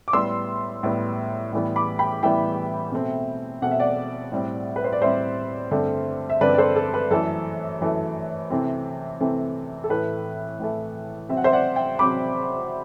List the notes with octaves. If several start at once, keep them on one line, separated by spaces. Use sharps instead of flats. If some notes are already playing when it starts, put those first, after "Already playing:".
D6
A2 G3 B3 C6 E6
A2 G3 B3
A2 E3 G3 B3
B5 D6
G5 B5
A2 E3 G3 B3 E5 G5
B2 A3 C4
B2 A3 C4 F#5
E5
D5 F#5
A2 G3 C4
B4
C5
D5
A2 G3 C4 C5 E5
G2 D3 A3 C4
E5
G2 D3 A3 C4 B4 D5
D5
A4 C5
A4
B4
F#2 E3 A3 A4
F#2 E3 A3
C3 E3 A3 C4
C3 E3 A3 C4
A4
A2 E3 A3 B4
A2 E3 A3
C3 F#3 C4 E5
F#5
C5 E5
D5 F#5
E5 G5
C3 F#3 C4 B5 D6